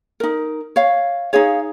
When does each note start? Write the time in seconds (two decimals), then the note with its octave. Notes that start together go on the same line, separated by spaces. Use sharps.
0.20 D#4 A#4
0.76 C#5 F5
1.33 D#4 G#4 C#5 F5